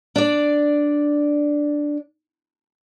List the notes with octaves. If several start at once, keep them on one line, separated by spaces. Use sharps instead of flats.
D4 D5